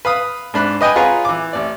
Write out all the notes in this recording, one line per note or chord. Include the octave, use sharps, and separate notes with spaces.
B4 F5 B5 D#6
G#2 D4 B5 F#6
B4 D#5 G5 G#5 B5
F4 G#4 B4 C#5 F#5 A#5
E3 D6
A1 D5